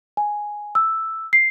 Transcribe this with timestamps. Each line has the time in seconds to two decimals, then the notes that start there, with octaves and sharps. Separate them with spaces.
0.17 G#5
0.75 E6
1.33 C7